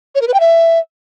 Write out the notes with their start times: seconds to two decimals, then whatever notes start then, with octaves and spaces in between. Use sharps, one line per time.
0.15 C#5
0.21 A#4
0.28 B4
0.34 G5
0.40 E5